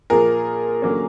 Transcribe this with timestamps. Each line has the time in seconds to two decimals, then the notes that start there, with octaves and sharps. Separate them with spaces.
0.10 A#2 F3 A#3 G#4 A#4
0.82 D3 F#3 A#3 C#4